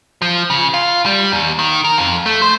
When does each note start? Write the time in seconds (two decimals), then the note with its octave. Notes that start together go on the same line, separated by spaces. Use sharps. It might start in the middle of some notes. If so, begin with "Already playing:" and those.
0.22 F3
0.50 C#3
0.74 F4
1.06 G3
1.32 D#2
1.59 D#3
1.85 A#4
1.97 F2
2.26 A3
2.42 C5